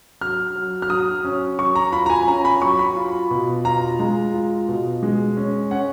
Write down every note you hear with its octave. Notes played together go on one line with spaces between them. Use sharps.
F#3 F6
F#3
F6
F#3 D#6
C#4
F#3 C#6
A#5
F4 B5
A#5
G#5
C#4 A#5
B5
F#3 C#6
B5
F4
B2
F4 A#5
G#3
F4
B2
G#3
C#4
C#4 F#5